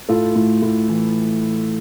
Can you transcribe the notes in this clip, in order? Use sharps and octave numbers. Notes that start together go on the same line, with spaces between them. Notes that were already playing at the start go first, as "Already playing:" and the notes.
A2 F4 A4
A2
A2
E3